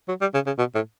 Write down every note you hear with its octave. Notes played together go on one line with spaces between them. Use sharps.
F#3
G3
C#3
C#3
B2
A2